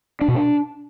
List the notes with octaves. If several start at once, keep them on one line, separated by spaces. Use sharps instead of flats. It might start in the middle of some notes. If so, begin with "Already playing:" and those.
D4
B2
D4